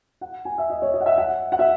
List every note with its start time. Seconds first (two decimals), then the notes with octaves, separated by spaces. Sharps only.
0.21 F#5
0.45 G#5
0.58 E5
0.70 D#5
0.82 C#5
0.94 D#5
1.01 F#5
1.06 E5
1.18 F#5
1.52 F#5
1.59 E5